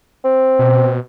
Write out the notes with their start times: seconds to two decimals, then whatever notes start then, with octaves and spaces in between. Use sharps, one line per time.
0.25 C4
0.59 B2